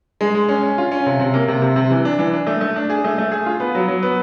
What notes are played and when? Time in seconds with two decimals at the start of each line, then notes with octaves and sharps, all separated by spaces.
0.21 G#3
0.35 G#3
0.49 C#4
0.63 C#4
0.78 F4
0.91 C#4
1.06 C3
1.20 C3
1.34 A#3
1.48 C3
1.62 C3
1.76 C3
1.91 E3
2.05 D4
2.19 E3
2.34 D4
2.47 A3
2.61 A3
2.76 D4
2.90 G#4
3.04 A3
3.18 A3
3.32 G#4
3.46 F4
3.60 B3
3.75 F#3
3.88 F#3
4.03 B3